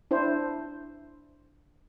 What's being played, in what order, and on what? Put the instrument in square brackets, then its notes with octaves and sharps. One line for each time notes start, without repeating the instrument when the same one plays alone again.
[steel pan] D4 E4 C5